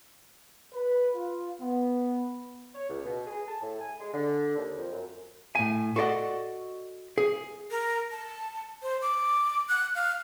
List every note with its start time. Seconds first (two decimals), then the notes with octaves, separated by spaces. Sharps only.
0.74 B4
1.15 F4
1.61 B3
2.74 C#5
2.89 C#2
3.05 B2
3.27 G#4
3.47 A5
3.62 A2
3.80 G#5
3.99 G#3
4.13 D3
4.57 D#2
4.77 F2
4.92 F#2
5.55 A2 G#5
5.96 F#4 A4 C5 D5 D#5 F#5
7.18 G#4
7.71 A#4
8.11 A5
8.82 C5
9.02 D6
9.69 F#6
9.95 F5